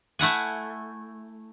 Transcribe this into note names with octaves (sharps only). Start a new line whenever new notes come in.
A3 E4 F#5 G#5